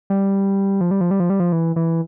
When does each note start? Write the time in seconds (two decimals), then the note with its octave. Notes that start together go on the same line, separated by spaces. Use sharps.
0.10 G3
0.81 F3
0.91 G3
1.01 F3
1.11 G3
1.20 F3
1.30 G3
1.40 F3
1.52 E3
1.76 E3